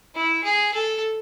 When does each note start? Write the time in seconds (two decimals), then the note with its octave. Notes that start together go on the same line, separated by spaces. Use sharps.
0.16 E4
0.44 G#4
0.74 A4